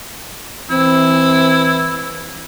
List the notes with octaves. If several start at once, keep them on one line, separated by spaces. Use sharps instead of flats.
E3 C4 E4